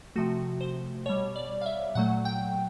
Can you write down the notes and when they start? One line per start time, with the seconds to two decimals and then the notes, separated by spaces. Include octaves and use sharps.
0.16 C3 F3 A3 F#4
0.61 C5
1.06 B2 G3 C#5
1.36 D5
1.61 F5
1.66 E5
1.95 A#2 F#3 A3 F#5
2.25 G5